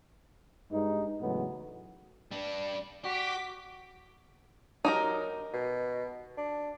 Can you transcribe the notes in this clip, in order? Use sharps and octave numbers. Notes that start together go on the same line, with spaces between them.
G2 G#3 D#4
E2 A2 C#3 F#3 G#3 B3
G3 D4
F#4 G4 D6 B6
F#3 D#4 G4 A#4
B2
D4